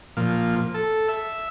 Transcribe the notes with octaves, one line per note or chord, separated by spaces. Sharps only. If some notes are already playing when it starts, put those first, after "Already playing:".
A#2 F3
A4
E5